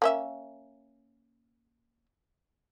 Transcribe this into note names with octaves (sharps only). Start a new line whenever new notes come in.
A#3 C#4 E5